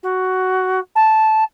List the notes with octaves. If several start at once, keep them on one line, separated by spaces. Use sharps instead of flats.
F#4
A5